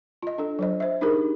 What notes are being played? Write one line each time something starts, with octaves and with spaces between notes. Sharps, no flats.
F4 D#5
D4 A4
F#3 C5 D#5
C5 E5
D4 D#4 G4 G#4 A#4